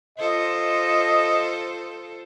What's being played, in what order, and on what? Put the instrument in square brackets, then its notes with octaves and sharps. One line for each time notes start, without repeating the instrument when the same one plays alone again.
[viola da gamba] F4 A4 C5 [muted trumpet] D#5